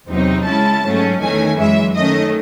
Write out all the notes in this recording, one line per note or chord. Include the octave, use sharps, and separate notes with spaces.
E2 C3 F#3 C4 D#4
C#3 G#3 C#4 E4 A5
G#2 F#3 A3 C#4
E2 D#3 A3 C#4 G#5
F#2 E3 G#3 E5
D#3 A3 C#4 D#5